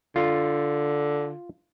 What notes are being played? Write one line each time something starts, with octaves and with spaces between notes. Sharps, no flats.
D3 F4